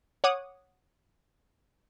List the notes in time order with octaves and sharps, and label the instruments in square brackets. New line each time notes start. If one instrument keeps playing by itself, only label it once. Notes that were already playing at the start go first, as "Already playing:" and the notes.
[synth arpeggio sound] C#5 F#5 D6 D#6